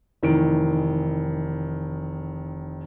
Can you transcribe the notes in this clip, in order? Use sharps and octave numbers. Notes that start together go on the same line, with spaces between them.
F1 D#3 E3 D7